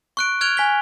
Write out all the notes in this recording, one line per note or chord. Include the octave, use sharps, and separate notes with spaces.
C#6 F#6 D7
F6 F#6 G#6 D7 F7 G7
G#5 B6 G7